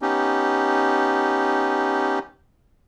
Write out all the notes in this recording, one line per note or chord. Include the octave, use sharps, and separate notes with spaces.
B3 C#4 D#4 G4